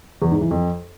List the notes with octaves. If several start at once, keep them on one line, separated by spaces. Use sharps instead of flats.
E2
G#2
E3
F2